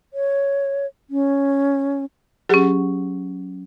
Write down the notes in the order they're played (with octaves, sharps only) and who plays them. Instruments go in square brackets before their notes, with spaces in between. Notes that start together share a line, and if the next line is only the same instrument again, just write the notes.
[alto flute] C#5
C#4
[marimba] F#3 C#4 [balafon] G4 G#4 F#5